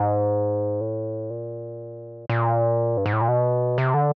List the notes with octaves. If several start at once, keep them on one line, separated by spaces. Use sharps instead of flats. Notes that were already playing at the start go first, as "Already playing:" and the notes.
Already playing: G#2
A2
A#2
A#2
G2
G#2
A2
A#2
B2
C3
D3